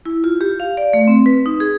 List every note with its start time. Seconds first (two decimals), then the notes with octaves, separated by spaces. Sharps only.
0.06 E4
0.24 F4
0.41 G4
0.60 F5
0.77 D5
0.93 A3
1.08 C4
1.26 B4
1.46 D#4
1.60 G#4